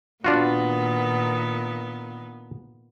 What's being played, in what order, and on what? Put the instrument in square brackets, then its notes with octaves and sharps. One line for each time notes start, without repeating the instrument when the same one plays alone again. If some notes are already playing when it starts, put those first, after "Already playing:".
[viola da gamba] A#2 D#3 B3 [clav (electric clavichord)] D4 F4 F#4